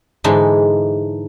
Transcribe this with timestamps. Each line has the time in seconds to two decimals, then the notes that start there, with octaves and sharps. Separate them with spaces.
0.24 G#2 D3 E3 G#3 D4 D#4